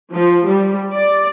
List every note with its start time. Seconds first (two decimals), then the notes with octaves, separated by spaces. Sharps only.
0.14 F3
0.48 G3
0.94 D5